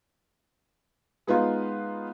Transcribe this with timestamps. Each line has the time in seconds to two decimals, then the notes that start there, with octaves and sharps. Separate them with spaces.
1.27 G#3 B3 D#4 F4